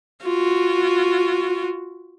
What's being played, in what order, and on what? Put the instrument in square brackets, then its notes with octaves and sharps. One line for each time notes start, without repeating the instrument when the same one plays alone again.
[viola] F4 F#4